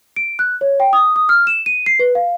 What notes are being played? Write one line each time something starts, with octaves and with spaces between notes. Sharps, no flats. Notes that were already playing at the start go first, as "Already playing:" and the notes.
D7
F#6
C#5
G5
D#6
D#6
F6
E7
D#7
C7
B4
F5